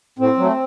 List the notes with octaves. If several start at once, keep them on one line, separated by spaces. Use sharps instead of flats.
A2 C4
F#3 A3